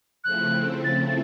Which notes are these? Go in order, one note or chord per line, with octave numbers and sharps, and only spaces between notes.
C#3 F3 A3 C4 E4 F#6
A6
A6